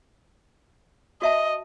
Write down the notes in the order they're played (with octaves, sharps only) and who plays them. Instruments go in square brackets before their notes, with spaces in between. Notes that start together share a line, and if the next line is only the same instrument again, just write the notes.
[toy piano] F#4 E5 A5 [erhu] D#5